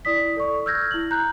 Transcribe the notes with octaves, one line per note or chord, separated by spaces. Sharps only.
E4 D5 D#6 B6
A4 D5 C#6
E6 F6 G6 G#6 A#6
E4 F#7
A#5 F#6 G6